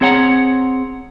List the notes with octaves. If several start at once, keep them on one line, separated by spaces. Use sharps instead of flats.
C4 G#4 C#5 F#5 G5 A#5